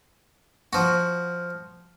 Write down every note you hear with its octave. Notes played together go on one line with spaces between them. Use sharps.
F3 F#4